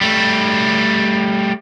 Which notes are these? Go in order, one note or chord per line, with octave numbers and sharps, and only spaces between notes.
G3 A3